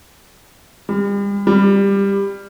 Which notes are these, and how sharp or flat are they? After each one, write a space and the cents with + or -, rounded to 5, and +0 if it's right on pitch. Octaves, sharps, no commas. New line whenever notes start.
G3 +40
G3 +15